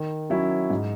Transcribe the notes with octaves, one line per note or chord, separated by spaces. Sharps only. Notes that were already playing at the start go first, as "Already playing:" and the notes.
Already playing: D#3
F#3 C#4 E4
G#2